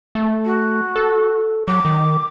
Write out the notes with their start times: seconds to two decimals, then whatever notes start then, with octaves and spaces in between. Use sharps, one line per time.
0.15 A3
0.45 F#4
0.96 A4
1.68 F#3 D6
1.85 D#3